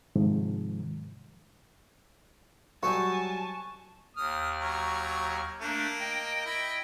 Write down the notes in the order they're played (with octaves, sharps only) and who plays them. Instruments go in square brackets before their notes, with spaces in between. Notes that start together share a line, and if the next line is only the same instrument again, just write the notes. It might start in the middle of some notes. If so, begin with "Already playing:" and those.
[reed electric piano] G#2 C3 D#3 F3 G#3
[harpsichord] F#3 G3 [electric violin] G#5 A5 [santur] C#6
[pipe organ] D#2 F6 [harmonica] D#6
[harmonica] F#3 C#5 A#5
[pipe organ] A3 D4 [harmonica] A#3
[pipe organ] D#5 G5
[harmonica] E4